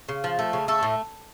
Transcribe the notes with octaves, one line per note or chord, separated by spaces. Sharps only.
C#3
F3
A3
C#3
A3 A4
A2